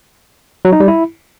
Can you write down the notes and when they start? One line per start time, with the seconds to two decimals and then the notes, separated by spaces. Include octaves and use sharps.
0.65 F#3
0.72 D#4
0.80 G3
0.88 E4